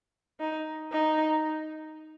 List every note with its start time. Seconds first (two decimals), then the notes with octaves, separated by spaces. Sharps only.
0.40 D#4
0.91 D#4